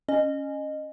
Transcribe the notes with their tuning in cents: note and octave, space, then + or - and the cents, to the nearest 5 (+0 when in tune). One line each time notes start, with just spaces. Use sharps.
C#4 +0 D#5 -20